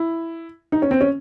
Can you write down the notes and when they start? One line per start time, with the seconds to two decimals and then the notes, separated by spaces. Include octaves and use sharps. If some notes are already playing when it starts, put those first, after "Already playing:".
Already playing: E4
0.72 D#4
0.82 C#4
0.91 C4
1.01 C#4